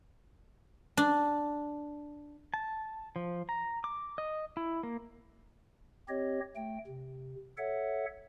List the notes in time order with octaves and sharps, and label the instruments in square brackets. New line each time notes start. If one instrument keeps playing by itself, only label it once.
[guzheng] D4
[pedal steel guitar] A5
F3
A#5
D6
D#5
E4
A#3
[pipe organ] C4 G4 C#5 D#5
A3 G5
C3
A4 C#5 E5 F#5